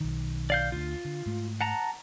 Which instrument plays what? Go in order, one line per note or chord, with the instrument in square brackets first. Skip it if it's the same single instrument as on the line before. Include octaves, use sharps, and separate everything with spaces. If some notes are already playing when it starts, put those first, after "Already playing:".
[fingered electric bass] B1 D#3
[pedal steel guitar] D5 F5 G6
[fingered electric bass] D2 D3 [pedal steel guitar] F4
[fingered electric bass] D3
G#2 A3
[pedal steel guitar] F#5 A5 A#5